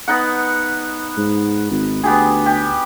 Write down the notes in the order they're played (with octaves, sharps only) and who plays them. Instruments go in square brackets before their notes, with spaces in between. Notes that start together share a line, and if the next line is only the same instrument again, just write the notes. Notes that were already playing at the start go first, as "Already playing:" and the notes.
[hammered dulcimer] B3 D#4 F#5
[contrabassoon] G#2
G#1
[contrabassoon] D2 [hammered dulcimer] B3 G4 G#4
[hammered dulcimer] G4